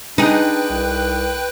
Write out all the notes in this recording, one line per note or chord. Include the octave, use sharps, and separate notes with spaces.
D4 D#4 G#4 B4 G5 F#6
C2